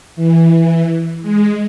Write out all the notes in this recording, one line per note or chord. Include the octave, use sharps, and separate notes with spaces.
E3
G#3